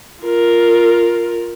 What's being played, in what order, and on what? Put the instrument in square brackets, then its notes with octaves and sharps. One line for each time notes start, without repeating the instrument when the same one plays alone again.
[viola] F4 A#4